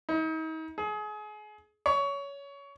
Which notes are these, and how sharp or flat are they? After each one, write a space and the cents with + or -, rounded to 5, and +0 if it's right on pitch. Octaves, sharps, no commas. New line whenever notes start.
D#4 +40
G#4 +30
C#5 +20